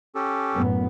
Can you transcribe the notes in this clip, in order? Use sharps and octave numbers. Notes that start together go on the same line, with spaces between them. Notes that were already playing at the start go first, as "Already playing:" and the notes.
C#4 G4 A4
F#2 A2 B3